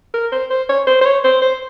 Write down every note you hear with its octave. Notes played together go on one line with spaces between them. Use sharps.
A#4
C5
C5
C#5
C5
C5
C#5
C5
C5